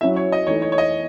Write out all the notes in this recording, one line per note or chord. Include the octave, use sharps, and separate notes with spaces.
F#3 C#4 E4 E5
C#5
D#5
E3 A3 D#4 C#5
C#5
C#5
D#5